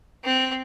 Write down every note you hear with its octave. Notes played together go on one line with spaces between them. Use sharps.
C4